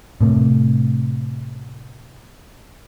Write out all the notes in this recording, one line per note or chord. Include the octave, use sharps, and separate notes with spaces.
A2 C3 A3